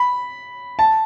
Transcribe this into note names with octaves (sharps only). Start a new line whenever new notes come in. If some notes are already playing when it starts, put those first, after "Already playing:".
Already playing: B5
A5